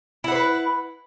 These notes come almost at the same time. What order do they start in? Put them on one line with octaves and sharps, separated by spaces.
E4 F#5 C5 B4